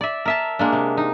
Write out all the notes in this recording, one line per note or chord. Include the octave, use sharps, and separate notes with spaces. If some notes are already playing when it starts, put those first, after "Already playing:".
D5 E5
A#4 E5 A5
G#3 A#3 D4
C3
D#4